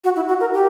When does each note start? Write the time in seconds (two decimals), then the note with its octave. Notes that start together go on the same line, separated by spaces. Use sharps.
0.04 F#4
0.16 E4
0.28 F#4
0.40 A#4
0.53 G4